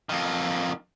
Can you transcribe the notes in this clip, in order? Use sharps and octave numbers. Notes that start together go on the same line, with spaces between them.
F2 D#3